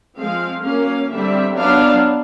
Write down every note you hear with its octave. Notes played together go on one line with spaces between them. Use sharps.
F3 G#3 C4 F5
F#3 A#3 C#4 F5
D3 G3 C4 E5
F#3 B3 D4 F5